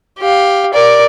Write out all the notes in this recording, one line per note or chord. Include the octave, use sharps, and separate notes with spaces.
G4 F5
A#4 D5